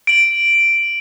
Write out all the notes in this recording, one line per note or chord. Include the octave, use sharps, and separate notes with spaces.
D7 F#7